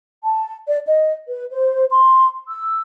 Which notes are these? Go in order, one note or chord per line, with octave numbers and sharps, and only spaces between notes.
A5
D5
D#5
B4
C5
C6
E6